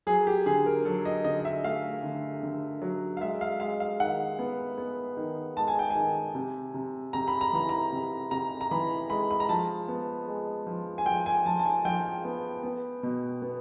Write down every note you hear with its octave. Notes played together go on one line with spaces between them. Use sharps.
F#3 G#4
G4
D3 G#4
A#4
F#3 A4
D#5
D3 D#5
D#5
E5
A3 F5
D3
D3
F#3
F5
G#3 E5
F5
G#3 F5
F5
D#3 F#5
B3
B3
D#3
G#3 A5
G#5
G5
G#5
D#3
C3
C3
C3 A#5
B5
A#5
E3 B5
A#5
C3
C3 A#5
A#5
E3 B5
G#3 B5
B5
A#5
F3 A5
B3
G#3
F3
G#5
F3 G5
G#5
F3 A5
A5
G#5
F3 G5
B3
B3
B2
B3